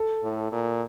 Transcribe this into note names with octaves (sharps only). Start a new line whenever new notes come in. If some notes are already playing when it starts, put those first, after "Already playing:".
Already playing: A4
A2
A#2